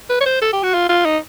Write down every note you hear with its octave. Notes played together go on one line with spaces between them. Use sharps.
B4
C#5
C5
A4
G4
F#4
F4
F4
D#4